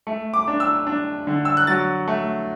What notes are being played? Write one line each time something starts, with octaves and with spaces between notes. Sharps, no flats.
A3
D6
D4
E6
D4
D3
E6
F#6
F#3 A6
A3